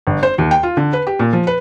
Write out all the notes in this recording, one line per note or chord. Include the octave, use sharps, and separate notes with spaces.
G1
C5
D#2
G5
F4
D3
B4
G4
A#2
F3
B4